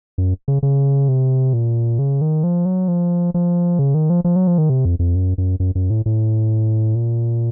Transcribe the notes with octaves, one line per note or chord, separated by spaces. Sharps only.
F#2
C#3
C#3
C3
A#2
C#3
D#3
F3
F#3
F3
F3
C#3
D#3
F3
F3
F#3
F3
D#3
C3
F2
F2
F#2
F#2
F#2
F#2
A2
A2
A#2